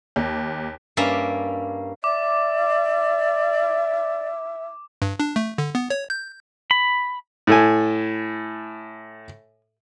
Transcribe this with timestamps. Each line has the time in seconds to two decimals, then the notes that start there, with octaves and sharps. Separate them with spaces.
0.16 D#2
0.97 G2 A#3 C#4 D5 E5 A#5
2.04 D5 E5 D6
5.02 G2
5.20 D4
5.36 A3
5.58 D3
5.75 B3
5.90 C#5
6.10 G6
6.71 B5
7.47 A2 A4 G#5